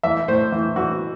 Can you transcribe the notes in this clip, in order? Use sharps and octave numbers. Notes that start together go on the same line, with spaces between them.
E3 E5
A2 C5
E3
E3 F#4